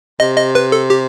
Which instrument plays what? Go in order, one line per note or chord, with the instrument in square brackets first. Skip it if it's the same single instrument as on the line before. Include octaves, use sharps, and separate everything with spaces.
[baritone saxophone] C3 [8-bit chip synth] D#5
[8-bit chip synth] D#5
B4
A4
G4